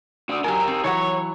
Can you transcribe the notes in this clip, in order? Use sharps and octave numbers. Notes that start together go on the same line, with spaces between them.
D4 F#4
F#3 A#3 G4 A#4 G#5
C4
E3 F#3 C#5 F#5